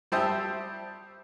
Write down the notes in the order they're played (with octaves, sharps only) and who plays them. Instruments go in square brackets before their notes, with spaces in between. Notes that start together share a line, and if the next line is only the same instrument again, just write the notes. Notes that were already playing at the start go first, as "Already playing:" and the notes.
[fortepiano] G3 G4 C5 E5 A5 D#6